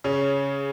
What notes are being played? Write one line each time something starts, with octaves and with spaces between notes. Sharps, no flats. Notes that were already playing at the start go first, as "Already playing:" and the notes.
C#3 C#4